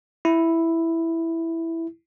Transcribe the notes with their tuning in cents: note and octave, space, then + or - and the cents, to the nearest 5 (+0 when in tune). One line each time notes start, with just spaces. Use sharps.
E4 +0